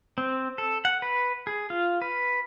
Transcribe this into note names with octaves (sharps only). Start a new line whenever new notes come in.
C4
A4
F#5
B4
G#4
F4
B4